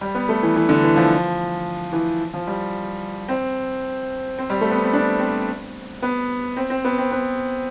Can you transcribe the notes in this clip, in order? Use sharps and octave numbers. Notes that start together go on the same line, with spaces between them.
G3
B3
A3
E3
E3
D3
E3
F3
E3
F3
G3
C4
C4
G3
A3
B3
C4
D4
C4
B3
C4
C4
B3
C4
B3